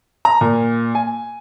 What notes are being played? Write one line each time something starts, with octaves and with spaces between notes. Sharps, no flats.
A#5
A#2
G#5